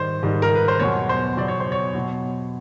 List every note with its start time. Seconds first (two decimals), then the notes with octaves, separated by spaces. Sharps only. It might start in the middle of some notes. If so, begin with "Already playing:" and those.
Already playing: G#2 D#3 G3 C5
0.23 G#2 D#3 G3
0.42 A#4
0.55 B4
0.68 C5
0.79 E2 B2 F#3 C#5
1.09 C5
1.37 E2 B2 F#3 D5
1.48 C#5
1.60 C5
1.72 C#5
1.94 B2 F#3